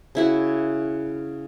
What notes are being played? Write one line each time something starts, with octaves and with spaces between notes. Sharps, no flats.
C#3 E4 F#4